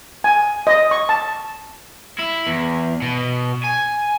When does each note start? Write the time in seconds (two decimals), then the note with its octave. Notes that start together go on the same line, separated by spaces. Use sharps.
0.24 G#5
0.67 D#5
0.91 C#6
1.09 A5
2.19 E4
2.47 E2
3.02 B2
3.64 G#5